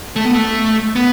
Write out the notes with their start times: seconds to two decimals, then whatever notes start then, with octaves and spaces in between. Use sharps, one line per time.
0.16 A3
0.25 B3
0.34 A3
0.96 B3